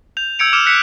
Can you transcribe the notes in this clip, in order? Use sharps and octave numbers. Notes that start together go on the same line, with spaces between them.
G6 F7
E6 G6 G#6 C#7 D7 F7
D6 E6 F6 C#7 E7 F7
F#6 B6 C#7 E7